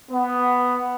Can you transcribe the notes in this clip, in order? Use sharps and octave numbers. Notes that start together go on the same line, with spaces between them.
B3